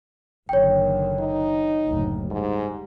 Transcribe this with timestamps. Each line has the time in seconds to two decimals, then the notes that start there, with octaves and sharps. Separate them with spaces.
0.49 F#1 D3 D#3 C#5 G5
1.19 D#4
1.86 F#1 D2 A2
2.31 G#2 G3